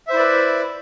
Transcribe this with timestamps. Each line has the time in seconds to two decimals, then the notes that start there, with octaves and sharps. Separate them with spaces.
0.07 E5
0.10 C5
0.13 E4
0.16 D5
0.19 B4